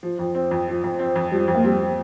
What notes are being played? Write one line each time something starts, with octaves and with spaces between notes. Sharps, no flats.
F3
F2
C4
F2
F3
F2
C4
F2
F3 G3
F2
A#3
G3 C4